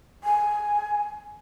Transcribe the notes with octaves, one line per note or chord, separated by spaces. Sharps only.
G#5